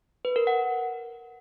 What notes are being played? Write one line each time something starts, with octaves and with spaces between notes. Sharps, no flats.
B4
A#4
F#5